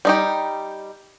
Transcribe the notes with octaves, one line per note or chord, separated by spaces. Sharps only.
G3 D#4 G4